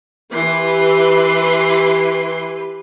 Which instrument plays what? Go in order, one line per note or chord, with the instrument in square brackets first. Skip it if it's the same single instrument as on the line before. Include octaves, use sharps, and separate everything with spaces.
[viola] E3 C6 [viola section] G4 B4